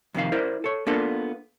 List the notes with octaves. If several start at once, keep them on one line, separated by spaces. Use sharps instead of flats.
F2 C3 D#3 F5
E4 A#4 C5 D5
A4 C#5
A#3 B3 D4 F4 A4 A#4